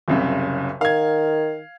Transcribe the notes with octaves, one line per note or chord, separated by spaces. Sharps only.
F#1 C2 C#3
D#3 F5 G#6